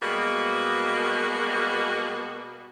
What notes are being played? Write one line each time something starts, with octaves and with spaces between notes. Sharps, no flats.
B2 G3 G#3 A#3 B3 F#4